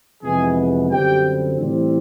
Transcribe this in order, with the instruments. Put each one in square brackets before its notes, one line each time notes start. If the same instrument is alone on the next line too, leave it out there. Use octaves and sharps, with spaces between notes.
[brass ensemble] F2 C3 E3 G#3 B3 G#4 G#5
F#2 D3 G3 C4 G4 G5
A2 E3 G3 C4